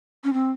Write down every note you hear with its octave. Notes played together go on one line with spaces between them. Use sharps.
C#4
C4